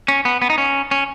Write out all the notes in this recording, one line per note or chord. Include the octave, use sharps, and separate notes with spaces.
C#4
B3
B3
D#4
C#4
C#4